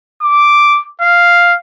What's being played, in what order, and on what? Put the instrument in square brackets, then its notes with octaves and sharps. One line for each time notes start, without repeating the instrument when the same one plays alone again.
[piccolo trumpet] D6
F5